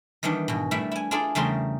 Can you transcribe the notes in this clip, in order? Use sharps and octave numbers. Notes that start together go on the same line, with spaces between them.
D#3 E3 G3 B3 D4 G4
G#2 B2
G3 A3 D4 E4 E5
E4 G#5
D4 E4 F4 G#4 A4 D5
E2 C#3 G3 A3 A#4 C6